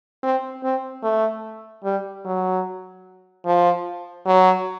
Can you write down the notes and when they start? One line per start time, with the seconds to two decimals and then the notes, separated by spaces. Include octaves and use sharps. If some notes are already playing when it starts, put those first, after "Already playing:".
0.23 C4
0.64 C4
1.03 A3
1.84 G3
2.25 F#3
3.46 F3
4.26 F#3